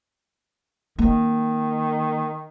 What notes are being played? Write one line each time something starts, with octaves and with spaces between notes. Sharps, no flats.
D#3 A#3 C4